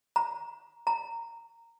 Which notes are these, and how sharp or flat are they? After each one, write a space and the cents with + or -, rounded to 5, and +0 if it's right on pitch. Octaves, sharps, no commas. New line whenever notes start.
A#5 +10
A#5 -15